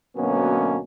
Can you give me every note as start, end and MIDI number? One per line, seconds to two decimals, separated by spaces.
0.17 0.80 38
0.17 0.80 47
0.17 0.80 54
0.17 0.80 58
0.17 0.80 59
0.17 0.80 61